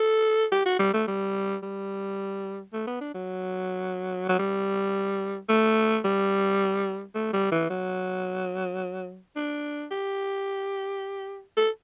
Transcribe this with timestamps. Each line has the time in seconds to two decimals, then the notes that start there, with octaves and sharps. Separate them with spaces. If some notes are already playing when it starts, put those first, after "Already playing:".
Already playing: A4
0.52 G4
0.66 F#4
0.79 G3
0.94 A3
1.08 G3
1.63 G3
2.73 A3
2.87 B3
3.01 D4
3.14 F#3
4.29 F#3
4.39 G3
5.49 A3
6.05 G3
7.15 A3
7.34 G3
7.52 E3
7.70 F#3
9.36 D4
9.91 G4
11.57 A4